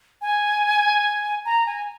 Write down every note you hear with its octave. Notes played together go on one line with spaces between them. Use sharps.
G#5
A#5
G#5